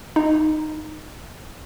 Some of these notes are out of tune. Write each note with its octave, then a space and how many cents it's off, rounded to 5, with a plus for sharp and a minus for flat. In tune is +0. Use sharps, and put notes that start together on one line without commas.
D#4 -10